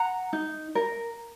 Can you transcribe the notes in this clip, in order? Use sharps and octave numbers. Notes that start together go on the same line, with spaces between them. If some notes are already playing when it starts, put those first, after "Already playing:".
Already playing: F#5 A#5
D#4
A#4